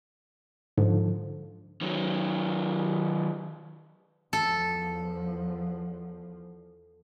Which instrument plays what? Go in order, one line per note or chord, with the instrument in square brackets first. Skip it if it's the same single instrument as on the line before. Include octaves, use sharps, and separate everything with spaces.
[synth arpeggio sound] G#2 [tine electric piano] D3 F3
[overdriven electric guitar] D#3 F#3
[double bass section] E2 F3 [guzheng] A4